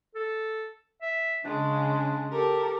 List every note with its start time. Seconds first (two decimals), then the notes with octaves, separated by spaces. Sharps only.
0.15 A4
1.02 E5
1.45 C#3 G#3 D4
2.31 G4 A4 A#4